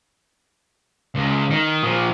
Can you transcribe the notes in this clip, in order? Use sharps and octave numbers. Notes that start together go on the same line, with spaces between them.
C#2
D#3
A#2 F3